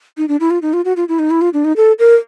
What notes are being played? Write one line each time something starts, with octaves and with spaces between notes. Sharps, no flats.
D#4
D4
E4
F4
D#4
F4
F#4
F4
E4
D#4
E4
F4
D4
D#4
A4
A#4